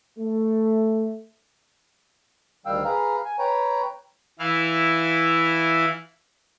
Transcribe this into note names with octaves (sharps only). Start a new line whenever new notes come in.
A3
D2 D#3 G3 F5 G5 E6
G#4 B4 F5 A#5
G#5
B4 C#5 G5 A#5
E3 E4 F5